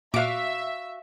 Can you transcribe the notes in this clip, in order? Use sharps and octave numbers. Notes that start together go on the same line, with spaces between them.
A#2 F#4 E5 F5 D6 D7